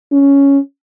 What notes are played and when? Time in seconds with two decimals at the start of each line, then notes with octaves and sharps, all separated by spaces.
0.12 C#4